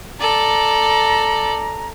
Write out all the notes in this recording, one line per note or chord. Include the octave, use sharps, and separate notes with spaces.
A4 D5 A#5